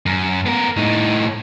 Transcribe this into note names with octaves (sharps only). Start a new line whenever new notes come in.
F#2
B3 A#4
A2 D#4